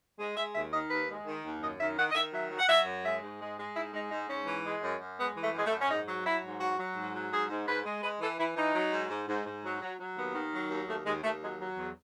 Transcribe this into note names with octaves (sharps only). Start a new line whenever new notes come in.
G#3
G#3 E5
D#2 E5
D#3 D#5
D#2 B4
G#3
D#3
D#2
F#2 D#5
D#3 E5
D#3 F#5
D#5
D#3 E5
F#3 E5
F#3
F#5
F#3 E5
F#2
G#3 E5
G#2
G#3
G#3
G#2 E4
G#3 D#4
G#2 D#4
G#2 C#4
E3
G#3
F#2
F#2
G#3 B3
E3
A3
F#2 G#3
A3
F#2
C#4
G#2 D#4
F#3
F#3 E4
G#2
F#3 F#4
F#3
G#2
F#3
G#2 G#4
G#2
G#2 B4
G#3
G#3 B4
E3 A4
E3 E4
E3 D#4
F#3
G#2
G#2
G#2
G#2
F#3
F#3
F#3
D#2 B3
D#3
F#3
D#2
D#2 A3
D#2 G#3
D#2 A3
F#3 G#3
F#3
E2